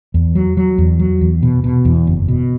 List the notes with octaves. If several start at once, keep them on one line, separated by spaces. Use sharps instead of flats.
E2
F#3
F#3
E2
F#3
E2
B2
B2
E2
F#1
B2